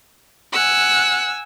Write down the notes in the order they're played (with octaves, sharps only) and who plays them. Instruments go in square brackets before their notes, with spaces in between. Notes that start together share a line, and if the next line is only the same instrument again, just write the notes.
[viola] F#5 [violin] G#5 E6